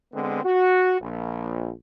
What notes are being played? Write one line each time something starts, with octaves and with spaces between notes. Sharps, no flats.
D3 G#3 B3 C4
F#4
A#1